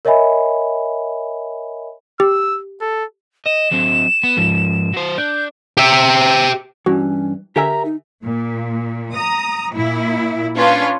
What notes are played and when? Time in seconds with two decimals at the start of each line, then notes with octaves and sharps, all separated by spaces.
0.05 A#4 C#5 D#5 E5 G#5 B5
2.20 G4 E6
2.81 A4
3.46 D#5 E7
3.71 F#3 C4
4.23 B3
4.37 G#2 F3
4.93 F#3 C5
5.18 D4 G6
5.77 G4 E5
6.86 G2 E3 C#4 F#4
7.56 D3 G4 A#4 E5 G#5 A#5 E6
7.85 D#4
8.23 A#2
9.13 A#5 D#6
9.74 A#2 E4
10.56 C#4 D4 F4 B4